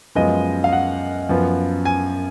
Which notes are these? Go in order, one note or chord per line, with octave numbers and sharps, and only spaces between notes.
F#2 F3 G#3 B3 D#5
F5
F#5
F#2 F3 B3
G#5